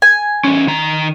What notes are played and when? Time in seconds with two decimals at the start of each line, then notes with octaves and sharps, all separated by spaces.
0.02 G#5
0.44 E2 C#4
0.67 D#3 A#5